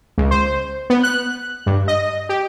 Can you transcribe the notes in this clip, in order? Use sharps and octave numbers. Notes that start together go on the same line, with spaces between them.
C#2
C5
B3
F#6
G2
D#5
G4